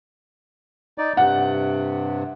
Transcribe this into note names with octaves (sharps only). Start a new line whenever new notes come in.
D#4 D5
G2 C3 F#5